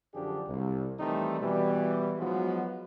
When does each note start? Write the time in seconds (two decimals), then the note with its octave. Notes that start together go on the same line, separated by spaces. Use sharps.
0.14 F#2 D3 F3 D4 G4 G#4
0.48 C2
1.00 D#3 E3 G3 A3 C4 D#4
1.40 B2 E3 G3
2.18 F3 F#3 G#3 B3 D#4 F#4